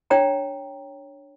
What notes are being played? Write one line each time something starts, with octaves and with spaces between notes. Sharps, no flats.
D4 C#5 G5 A#5